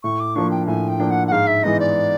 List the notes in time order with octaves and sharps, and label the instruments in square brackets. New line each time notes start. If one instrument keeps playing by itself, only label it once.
[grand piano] A2 [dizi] C#6
[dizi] D6
[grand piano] F3 A#3 D4 [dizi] C#6
[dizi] G5
[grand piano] A2 [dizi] G#5
[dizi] G5
[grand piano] F3 A#3 D4
[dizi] F#5
F#5
[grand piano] G#2 [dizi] F5
[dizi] E5
[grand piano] E3 G#3 B3 D#4 [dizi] D#5
[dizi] D5